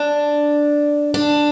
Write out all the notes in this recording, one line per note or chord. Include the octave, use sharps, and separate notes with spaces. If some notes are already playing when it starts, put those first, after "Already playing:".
Already playing: D4
D4